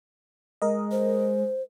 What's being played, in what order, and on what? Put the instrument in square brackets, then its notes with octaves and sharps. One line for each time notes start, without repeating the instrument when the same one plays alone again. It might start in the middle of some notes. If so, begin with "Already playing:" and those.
[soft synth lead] G#3 [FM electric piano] A#4 D#5
[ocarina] C5